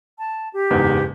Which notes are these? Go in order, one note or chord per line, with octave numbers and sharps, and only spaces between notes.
A5
G4
F#1 E2 G#2